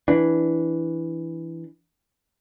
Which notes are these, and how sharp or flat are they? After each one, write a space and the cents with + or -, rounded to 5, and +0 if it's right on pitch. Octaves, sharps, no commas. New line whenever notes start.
E3 +0 D4 +0